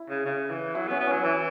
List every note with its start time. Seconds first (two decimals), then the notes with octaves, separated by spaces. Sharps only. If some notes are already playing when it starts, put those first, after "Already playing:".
Already playing: E4
0.10 C#3
0.25 C#3
0.50 E3
0.75 F#3 E4
0.87 B3
0.91 C#4
0.99 B3
1.07 F#3 C#4
1.23 E3 E4